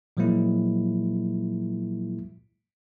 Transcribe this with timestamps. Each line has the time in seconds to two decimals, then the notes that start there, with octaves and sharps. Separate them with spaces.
0.17 A#2 F3 F#3 G#3 A#3 E4